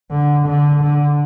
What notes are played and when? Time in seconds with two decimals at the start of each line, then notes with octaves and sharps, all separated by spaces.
0.11 D3
0.47 D3
0.82 D3